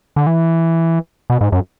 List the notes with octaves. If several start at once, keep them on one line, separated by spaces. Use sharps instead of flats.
D3
E3
B2
G#2
F#2